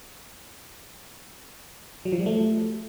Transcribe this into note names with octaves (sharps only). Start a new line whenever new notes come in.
F#3
F3
G3
A3